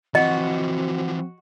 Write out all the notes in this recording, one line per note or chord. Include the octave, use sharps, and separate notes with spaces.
E3 F3 C4 F#4 D#5